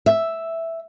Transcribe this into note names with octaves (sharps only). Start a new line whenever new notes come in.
E5